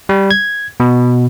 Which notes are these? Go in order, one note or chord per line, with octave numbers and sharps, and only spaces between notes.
G3
G#6
B2